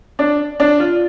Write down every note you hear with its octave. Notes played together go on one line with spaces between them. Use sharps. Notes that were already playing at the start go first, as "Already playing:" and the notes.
D4
D4
F4